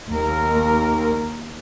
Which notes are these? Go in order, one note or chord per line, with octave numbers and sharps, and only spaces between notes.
D#2 A#4